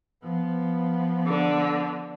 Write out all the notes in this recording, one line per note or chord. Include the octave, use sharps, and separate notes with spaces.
F3 B3
D3